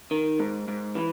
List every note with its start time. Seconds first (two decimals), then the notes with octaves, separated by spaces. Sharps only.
0.11 D#3
0.39 G#2
0.68 G#2
0.95 E3